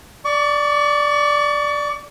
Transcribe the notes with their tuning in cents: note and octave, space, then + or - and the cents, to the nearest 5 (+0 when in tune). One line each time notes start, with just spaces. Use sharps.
D5 +0 C#6 +35